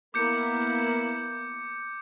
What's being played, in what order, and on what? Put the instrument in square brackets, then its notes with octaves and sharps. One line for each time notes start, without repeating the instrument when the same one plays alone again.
[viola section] A#3 B3 E4 [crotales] D6 G6 C#7